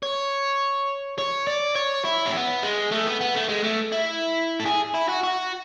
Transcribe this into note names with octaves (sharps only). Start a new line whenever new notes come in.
C#5
C#5
D5
C#5
E4
C#4
B3
G#3
A3
B3
B3
A3
G#3
A3
E4
A4
G#4
E4
F#4
F#4